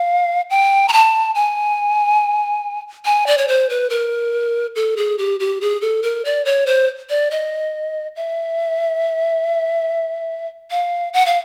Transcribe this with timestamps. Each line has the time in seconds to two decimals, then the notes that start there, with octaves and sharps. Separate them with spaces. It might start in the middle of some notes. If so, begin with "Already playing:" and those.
Already playing: F5
0.50 G5
0.88 A#5
0.93 A5
1.35 G#5
3.05 G#5
3.27 D5
3.38 C#5
3.48 C5
3.70 B4
3.90 A#4
4.75 A4
4.97 G#4
5.18 G4
5.40 G4
5.61 G#4
5.81 A4
6.03 A#4
6.25 D5
6.45 C#5
6.66 C5
7.09 D5
7.31 D#5
8.16 E5
10.70 F5
11.13 F#5
11.26 F5